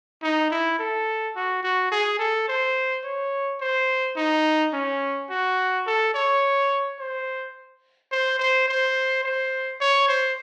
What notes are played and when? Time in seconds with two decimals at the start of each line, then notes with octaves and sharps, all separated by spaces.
0.23 D#4
0.51 E4
0.79 A4
1.36 F#4
1.63 F#4
1.92 G#4
2.19 A4
2.48 C5
3.04 C#5
3.60 C5
4.17 D#4
4.73 C#4
5.30 F#4
5.86 A4
6.14 C#5
6.99 C5
8.12 C5
8.39 C5
8.68 C5
9.23 C5
9.80 C#5
10.08 C5